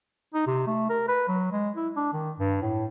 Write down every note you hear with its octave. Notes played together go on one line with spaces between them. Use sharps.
D#4
C3
A3
A#4
B4
F#3
G#3
E4
D4
D#3
G2
A2